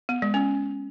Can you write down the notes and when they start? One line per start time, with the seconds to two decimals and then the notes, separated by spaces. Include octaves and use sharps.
0.09 B3
0.22 G#3
0.34 C#4